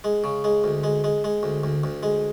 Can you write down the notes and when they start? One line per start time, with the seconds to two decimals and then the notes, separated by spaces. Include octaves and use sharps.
0.04 G#3
0.24 C#3
0.44 G#3
0.64 D2
0.84 G#3
1.04 G#3
1.24 G#3
1.43 D2
1.63 D2
1.84 D2
2.03 G#3